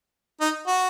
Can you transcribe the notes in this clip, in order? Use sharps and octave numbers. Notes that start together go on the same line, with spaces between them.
D#4
F#4